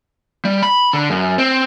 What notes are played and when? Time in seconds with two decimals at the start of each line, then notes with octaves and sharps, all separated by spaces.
0.45 G3
0.63 B5
0.93 D3
1.10 F#2
1.38 C4